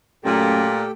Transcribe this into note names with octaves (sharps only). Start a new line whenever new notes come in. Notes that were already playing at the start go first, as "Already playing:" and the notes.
F#2 A#2 A3 G4 A4 G5